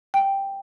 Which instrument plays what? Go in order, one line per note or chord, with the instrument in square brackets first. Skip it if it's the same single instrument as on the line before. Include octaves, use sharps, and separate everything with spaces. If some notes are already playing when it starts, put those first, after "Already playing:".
[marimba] G5